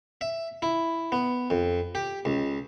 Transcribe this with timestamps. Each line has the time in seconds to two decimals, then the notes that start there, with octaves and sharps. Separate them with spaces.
0.21 E5
0.62 E4
1.12 B3
1.50 F2
1.95 G4
2.25 C#2